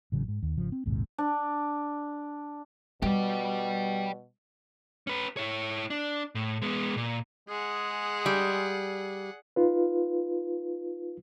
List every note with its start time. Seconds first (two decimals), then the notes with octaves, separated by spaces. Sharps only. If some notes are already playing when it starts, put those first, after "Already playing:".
0.12 A1 C#3 F#3
0.28 G#2
0.43 D#2
0.57 G#1 C#3 F3
0.72 C4
0.86 A#1 D#2 G#2 C3
1.18 D4
3.02 B2 G3 G4 D5
5.07 C#4 B4
5.37 E4 C#5
5.90 D4
6.35 A2
6.62 G#3 B3
6.97 A#2
7.49 G#3 G#4 F#5
8.26 G3
9.56 D#4 F4 B4